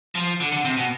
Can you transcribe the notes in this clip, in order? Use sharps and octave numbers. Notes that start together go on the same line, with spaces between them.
F3
D3
D3
C3
B2